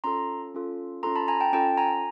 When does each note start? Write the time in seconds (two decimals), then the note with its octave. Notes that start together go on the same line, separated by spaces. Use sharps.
0.04 C#4 F4 A4 A#5 C6
0.54 C#4 F4 A4
1.03 C#4 F4 A4 A#5 C6
1.16 A5 B5
1.28 G#5 A#5
1.40 G5 A5
1.53 C#4 F4 A4 G5 A5
1.77 G#5 A#5